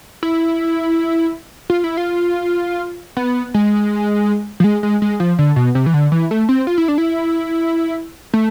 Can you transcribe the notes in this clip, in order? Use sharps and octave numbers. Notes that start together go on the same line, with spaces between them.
E4
F4
E4
F4
B3
G#3
F3
G#3
G#3
G#3
F3
D3
B2
C3
E3
D3
E3
A3
C4
F4
E4
D4
E4
A3